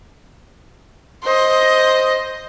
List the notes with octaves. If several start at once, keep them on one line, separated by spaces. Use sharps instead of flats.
C5 D#5